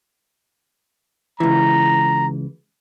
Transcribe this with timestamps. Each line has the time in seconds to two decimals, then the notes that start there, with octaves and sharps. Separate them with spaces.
1.40 C#2 E3 A#5